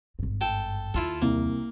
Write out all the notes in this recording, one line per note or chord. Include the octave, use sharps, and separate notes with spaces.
G#1 G2
A4 G5 A5
D#2 E4 F4 A4
C2 A#3